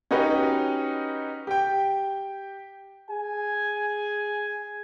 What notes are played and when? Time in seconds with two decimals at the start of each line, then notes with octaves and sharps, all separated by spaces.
0.11 C#4 D#4 F#4 G4 B4
1.47 G4 G5
3.10 G#4 G#5